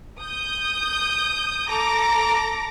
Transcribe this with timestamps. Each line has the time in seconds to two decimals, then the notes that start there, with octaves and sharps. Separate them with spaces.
0.19 D#6 G6
1.68 A4 A#5 D6 A#6